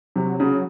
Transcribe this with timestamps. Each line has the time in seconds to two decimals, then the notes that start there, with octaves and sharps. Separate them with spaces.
0.16 C3 F#3
0.40 C#3 F#3